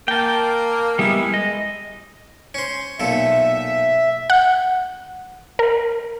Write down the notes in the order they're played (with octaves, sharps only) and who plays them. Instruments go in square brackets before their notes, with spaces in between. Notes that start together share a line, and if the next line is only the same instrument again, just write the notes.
[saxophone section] A#3 [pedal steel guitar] G5 A5
[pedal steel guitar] G3 B3 E4 [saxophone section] G#3
[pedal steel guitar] D#5
[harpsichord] C#4 C5
[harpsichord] B1 A#2 A4 [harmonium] E5
[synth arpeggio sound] F#5
A#4